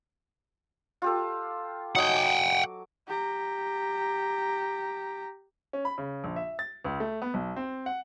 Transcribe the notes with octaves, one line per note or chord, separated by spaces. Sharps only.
F4 G4 A4
F#3 D#4 F#5 G5 D#6
D6
G4 A#5
C#4
B5
C#3
A#1
E5
A6
C#2
A3
B3
B1
C4
F#5